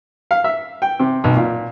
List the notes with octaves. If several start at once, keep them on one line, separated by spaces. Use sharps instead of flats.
F5
E5
G5
C3
B1
A#2